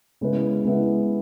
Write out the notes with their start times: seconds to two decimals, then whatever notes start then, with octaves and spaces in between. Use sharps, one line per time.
0.21 C#3 G#3 B3 E4 B4
0.65 C#3 G#3 B3 E4 B4